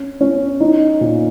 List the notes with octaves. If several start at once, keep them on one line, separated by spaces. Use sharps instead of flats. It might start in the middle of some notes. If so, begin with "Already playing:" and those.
Already playing: C#4
C#4
D#4
A#2